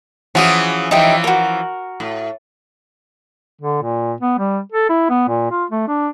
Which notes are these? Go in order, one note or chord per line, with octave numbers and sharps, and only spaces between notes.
E3 F3 C#4 F#4 G#4 D#6
E3 F3 D#4 G4 E5
F#4 A#4
A2
D3
A#2
B3
G3
A4
E4
B3
A#2
F4
A3
D4